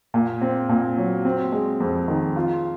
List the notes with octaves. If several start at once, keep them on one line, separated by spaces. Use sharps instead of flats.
A#2
C4
A#2
F#3
C4
G#3
F2
D#3
F4